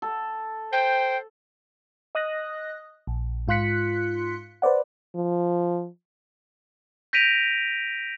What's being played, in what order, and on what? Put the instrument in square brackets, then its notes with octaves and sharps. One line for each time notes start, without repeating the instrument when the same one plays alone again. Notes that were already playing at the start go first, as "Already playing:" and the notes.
[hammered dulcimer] A4
[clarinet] C5 [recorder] G5
[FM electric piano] D#5 D#6 F#6 A#6
A#1
G#2 F4 C6 F#6 B6 C#7
B4 C5 D5 F#5
[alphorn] F3
[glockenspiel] G6 A#6 B6 D7 D#7 F7